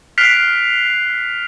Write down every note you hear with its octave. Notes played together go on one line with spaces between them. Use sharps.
F6 F#6 B6 C7 D7 F7